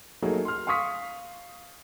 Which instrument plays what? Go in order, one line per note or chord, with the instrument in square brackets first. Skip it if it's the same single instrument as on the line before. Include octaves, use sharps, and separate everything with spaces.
[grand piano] F#3 A3 A#3 D#4 G#4
C6 F6
F5 C6 C#6 D#6 B6